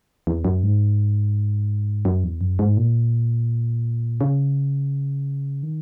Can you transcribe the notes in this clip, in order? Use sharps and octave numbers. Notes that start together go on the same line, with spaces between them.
E2
F#2
G#2
F#2
E2
F#2
G#2
A#2
C#3
D#3